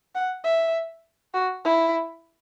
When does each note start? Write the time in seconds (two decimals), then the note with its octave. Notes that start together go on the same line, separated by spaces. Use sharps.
0.15 F#5
0.44 E5
1.34 F#4
1.64 E4